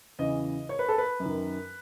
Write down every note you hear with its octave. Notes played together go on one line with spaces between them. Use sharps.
E2 C#3 E3 D#5
C#5
B4
A4
B4
F#2
D#3